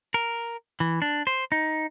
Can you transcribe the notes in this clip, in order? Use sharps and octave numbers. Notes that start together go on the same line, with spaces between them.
A#4
E3
D4
C5
D#4